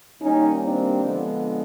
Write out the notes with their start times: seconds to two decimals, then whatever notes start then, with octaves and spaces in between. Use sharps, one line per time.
0.22 D#3 G3 A#3 C#4 D#4
0.62 C4 D4
1.02 D3 F3 G#3 B3